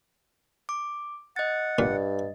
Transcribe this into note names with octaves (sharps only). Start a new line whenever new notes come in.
D6
D#5 F#5 A6
G2 A#2